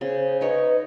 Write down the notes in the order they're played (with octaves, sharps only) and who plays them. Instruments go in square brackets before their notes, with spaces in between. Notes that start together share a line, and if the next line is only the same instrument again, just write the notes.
[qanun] C#3 [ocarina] G#4 [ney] C5
[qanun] D#4 C#5 [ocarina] B4 [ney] D#5